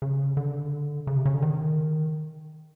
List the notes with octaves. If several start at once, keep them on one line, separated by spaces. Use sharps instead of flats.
C#3
D3
C#3
C3
C#3
D3
D#3